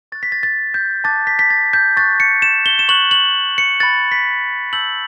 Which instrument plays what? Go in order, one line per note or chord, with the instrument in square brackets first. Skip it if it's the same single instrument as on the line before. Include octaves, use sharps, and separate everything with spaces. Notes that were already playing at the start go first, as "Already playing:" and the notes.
[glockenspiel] C#6 F#6 A6
B6
A6
A6
G6
A5 D6 F#6 A6
B6
B6
A6
G6
C#6 F#6 A6
C#7
E7
G7
E7
C#6 F#6 F#7
F#7
C#7
B5 F#6 A6
B6
A5 E6 G6 F#7